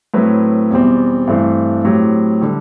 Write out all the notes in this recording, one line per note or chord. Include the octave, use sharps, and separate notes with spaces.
A2 F#3 C4 E4 B4
E2 B2 G3 C4
G2 E3 A3 C4
A2 F#3 C4 G4
D3 G3